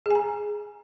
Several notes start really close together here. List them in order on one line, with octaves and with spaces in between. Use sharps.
G#4 G#5 A#5